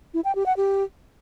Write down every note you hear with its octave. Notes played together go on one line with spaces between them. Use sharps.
E4
G5
G4
F#5
G4